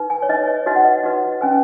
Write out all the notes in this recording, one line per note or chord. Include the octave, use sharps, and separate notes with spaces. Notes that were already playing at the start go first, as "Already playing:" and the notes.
Already playing: D#4 B4
G#5
C#5
D#4 B4 D#5
C#5
D#4 F#4 B4 D#5
F#5
D#5
D#4 F#4 B4
C#4 B4 G#5